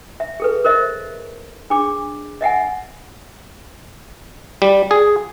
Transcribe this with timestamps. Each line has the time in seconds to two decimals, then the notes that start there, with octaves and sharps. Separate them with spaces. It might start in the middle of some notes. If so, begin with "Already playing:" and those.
0.20 E5
0.40 G#4 A4 B4
0.65 A#4 C5 D#5 E5
1.70 D4 G#4 D6
2.41 D#5 E5 F#5 G#5
4.62 G3
4.91 G#4